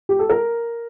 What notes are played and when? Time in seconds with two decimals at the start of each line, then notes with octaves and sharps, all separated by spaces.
0.09 G4
0.19 A4
0.29 A#4